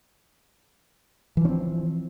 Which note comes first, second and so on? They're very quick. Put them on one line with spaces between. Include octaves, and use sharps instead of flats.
E3 F3 C#4 C4